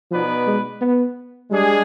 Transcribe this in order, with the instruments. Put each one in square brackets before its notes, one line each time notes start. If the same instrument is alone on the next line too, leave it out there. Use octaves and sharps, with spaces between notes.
[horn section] B2 B3 D#4 B4 D5 [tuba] F3
[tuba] G#3
B3
[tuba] G3 [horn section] G#3 D4 G#4